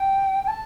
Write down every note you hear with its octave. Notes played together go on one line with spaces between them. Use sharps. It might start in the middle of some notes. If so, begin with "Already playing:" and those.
Already playing: G5
G5
A5